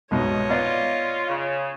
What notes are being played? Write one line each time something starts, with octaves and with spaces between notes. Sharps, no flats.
C2 G#2 B2 C#5 D#5
B3 F4 D5
C#3